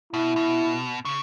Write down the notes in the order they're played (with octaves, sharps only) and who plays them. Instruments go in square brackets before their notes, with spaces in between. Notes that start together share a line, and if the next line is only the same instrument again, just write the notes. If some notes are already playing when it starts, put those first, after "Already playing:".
[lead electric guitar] B2 [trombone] E4
[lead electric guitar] B2
C#3